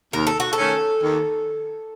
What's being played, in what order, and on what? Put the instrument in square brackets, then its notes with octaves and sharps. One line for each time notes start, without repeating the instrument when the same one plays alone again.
[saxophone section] D#2 [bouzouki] A#4
[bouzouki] A4
F#4
A4
[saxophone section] D#3 A3 C#4
D#2